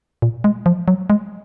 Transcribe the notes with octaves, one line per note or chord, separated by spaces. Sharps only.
A#2
G#3
F3
F#3
G#3